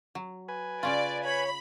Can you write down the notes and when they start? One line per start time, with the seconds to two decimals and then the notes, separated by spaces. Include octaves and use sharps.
0.15 F#3
0.49 B4 G#5
0.83 C#3 C#4 F4 D5
1.25 C#5 B5